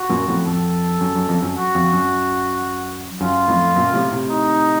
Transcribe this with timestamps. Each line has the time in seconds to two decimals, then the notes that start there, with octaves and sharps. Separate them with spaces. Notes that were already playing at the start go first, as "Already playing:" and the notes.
Already playing: F#4
0.09 F#2 A#2
0.28 F2 A2
0.46 F2 A4
1.01 F#2
1.15 F#2
1.29 F2
1.42 F#2
1.57 F#4
1.75 F2
1.93 F#2
3.21 F#2 F4
3.48 F2 A2
3.76 F#2 A#2
3.94 A2 C3
4.12 A2 C3
4.30 D#4